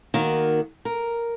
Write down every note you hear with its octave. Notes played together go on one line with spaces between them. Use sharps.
D#3 A#3 F#4
A#4